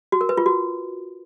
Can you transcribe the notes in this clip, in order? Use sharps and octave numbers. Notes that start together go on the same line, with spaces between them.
F#4
A#4
B4
F4
F#4